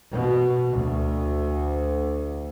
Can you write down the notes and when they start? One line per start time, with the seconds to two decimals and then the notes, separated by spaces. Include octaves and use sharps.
0.13 B2
0.73 D2